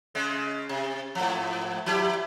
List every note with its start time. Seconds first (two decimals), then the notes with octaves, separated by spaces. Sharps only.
0.15 C#3 G#3
0.69 C3
1.15 G#2 F3
1.86 F3 E4 G4